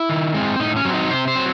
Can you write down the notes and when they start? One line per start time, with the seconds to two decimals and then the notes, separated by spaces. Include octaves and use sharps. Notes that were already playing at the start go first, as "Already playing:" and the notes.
Already playing: E4
0.09 D#3
0.34 G#3 C4
0.60 A2 D#4
0.76 C#4
0.85 F#3 C4
0.94 D#4
1.10 C3 C5
1.28 C5
1.35 F#3 C4